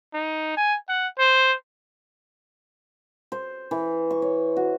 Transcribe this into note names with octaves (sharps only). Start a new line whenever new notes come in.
D#4
G#5
F#5
C5
C5
E3
C#6
C#5
F#4